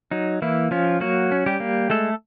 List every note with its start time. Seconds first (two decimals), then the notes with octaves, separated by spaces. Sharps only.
0.11 F#3 D#4
0.42 E3 A#3 E4
0.71 F3 C#4 F4
1.00 F#3 A#3 F#4
1.32 C#4
1.46 G3 G4
1.60 A#3
1.90 G#3 A3 A4